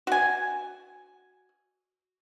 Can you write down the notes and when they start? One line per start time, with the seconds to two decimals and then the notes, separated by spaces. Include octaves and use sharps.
0.07 F#4 G#5